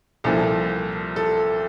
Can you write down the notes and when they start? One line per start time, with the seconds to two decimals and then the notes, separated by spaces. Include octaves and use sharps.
0.24 C2 A#2 F3 A4
1.16 A4